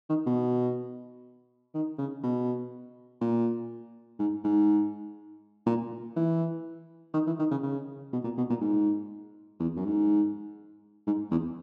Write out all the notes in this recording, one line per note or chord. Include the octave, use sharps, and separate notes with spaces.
D#3
B2
D#3
C#3
B2
A#2
G#2
G#2
A#2
E3
D#3
E3
D#3
C#3
C#3
B2
A#2
B2
A#2
G#2
E2
F#2
G#2
G#2
E2